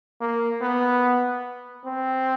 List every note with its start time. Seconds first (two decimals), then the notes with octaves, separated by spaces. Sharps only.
0.21 A#3
0.61 B3
1.85 C4